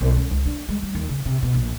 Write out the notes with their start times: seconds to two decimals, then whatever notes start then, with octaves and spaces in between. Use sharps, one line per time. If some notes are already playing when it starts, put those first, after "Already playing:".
0.01 B1
0.17 C#4
0.31 C#2
0.46 D4
0.69 G#3
0.83 G3
0.95 D#2
1.09 C#3
1.25 C3
1.43 B2
1.54 A#1